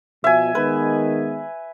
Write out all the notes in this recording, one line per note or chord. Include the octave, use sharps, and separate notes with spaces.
B2 F3 E5 G#5
D#3 G#3 B3 B4